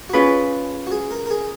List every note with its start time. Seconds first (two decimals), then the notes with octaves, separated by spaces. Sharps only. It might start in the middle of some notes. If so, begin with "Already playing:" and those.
0.10 F#4
0.13 C#4 F4 G#4 B4
0.87 F#4
0.92 G#4
1.11 A#4
1.26 A#4
1.31 G#4